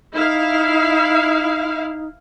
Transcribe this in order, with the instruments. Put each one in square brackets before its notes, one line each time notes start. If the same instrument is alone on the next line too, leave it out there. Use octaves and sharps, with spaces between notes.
[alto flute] D#4 [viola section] E4 F5